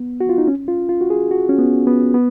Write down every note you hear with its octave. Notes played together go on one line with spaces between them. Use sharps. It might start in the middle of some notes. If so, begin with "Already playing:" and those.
Already playing: B3
F#4
F4
D#4
C#4
F4
F4
F#4
G#4
F#4
C#4
B3
B3
B3